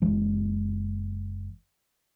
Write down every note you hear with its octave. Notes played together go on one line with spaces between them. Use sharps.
F#1 E3 G#3